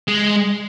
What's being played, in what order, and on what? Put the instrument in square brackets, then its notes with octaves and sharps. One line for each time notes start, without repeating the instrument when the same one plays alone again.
[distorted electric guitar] G#3